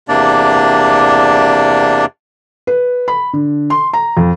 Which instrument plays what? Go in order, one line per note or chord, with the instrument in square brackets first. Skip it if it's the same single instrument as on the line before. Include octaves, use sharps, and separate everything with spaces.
[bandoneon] E2 C3 A#3 D4 D5
[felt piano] B4
B5
D3
C6
A#5
F2